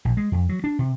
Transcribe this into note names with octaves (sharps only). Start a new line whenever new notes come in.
A#1
G#3
F2
F#3
D4
C3